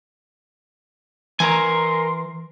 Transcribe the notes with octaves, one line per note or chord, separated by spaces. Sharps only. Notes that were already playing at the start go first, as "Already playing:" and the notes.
E3 A#4 G#5 A#5 C6